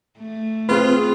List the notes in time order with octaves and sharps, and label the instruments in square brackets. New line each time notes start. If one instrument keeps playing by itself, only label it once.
[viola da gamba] A3
[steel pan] C4 B4 [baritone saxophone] F4 [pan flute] G#4